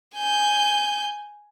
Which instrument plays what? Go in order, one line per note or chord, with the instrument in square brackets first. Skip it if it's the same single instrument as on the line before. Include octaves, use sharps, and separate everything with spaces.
[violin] G#5 G6